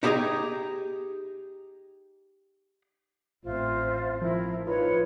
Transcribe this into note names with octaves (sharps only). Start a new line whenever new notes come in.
D#4 E4 G4 G#4 D#5 A#5
A1 C4 F4 C5 E5
F3 E4 A#4
F3 D#4 F4 B4 C#5 B5